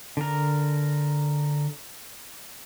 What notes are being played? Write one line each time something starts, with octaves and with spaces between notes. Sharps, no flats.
D3 A#4